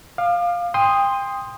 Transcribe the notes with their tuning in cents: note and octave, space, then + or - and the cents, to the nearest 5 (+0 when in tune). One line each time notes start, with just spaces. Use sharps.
F5 +5 D6 +40
G5 +30 C6 +0 D#6 +0